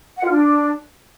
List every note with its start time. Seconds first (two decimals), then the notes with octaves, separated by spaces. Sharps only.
0.17 F#5
0.24 F4
0.31 D4